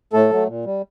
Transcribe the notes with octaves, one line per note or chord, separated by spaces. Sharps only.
A2 A3 A4
F#3 A3
A#2
G3